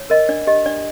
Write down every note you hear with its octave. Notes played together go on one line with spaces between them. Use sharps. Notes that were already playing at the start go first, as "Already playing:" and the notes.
Already playing: C#5
A#4 D#5
D4 D5
G4 D#5
D4 D5